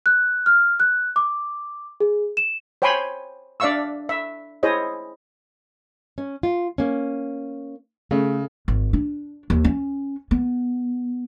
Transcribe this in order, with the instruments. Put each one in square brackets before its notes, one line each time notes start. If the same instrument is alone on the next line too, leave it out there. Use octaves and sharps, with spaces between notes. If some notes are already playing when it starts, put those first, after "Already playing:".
[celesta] F#6
F6
F#6
D6
G#4
E7
[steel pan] C5 C#5 G5 G#5 B5 C6
D4 D5 E5 F5 C#6 E6
E5
E4 G#4 C5 C#5 D#5
[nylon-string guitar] C#4
F4
A#3 C#4
[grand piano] C#3 [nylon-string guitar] A3
[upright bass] G#1
D4
D#2
C#4
B3